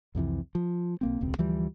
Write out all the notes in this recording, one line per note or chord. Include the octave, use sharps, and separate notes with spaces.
C2 F2 C3 E3
F3
B1 A#3 C4
E1 C#2 C4
D2 E3 F3 G3